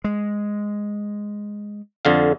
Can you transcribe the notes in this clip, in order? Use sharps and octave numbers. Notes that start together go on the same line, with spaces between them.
G#3
F2 D3 F5